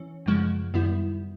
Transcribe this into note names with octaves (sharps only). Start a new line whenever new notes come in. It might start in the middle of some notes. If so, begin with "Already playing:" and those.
Already playing: E3 C#4
F#2 C#3 F3 G#3
F#2 D#3 G3 B3 E4